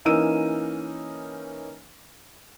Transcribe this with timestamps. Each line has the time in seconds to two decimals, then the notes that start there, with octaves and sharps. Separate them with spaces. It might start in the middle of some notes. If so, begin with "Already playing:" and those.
0.05 E3 A#3 C#4 D#4 E6 D#7